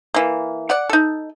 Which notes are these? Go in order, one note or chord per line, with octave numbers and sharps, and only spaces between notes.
E3 A#3
D5 F#5
D#4 A4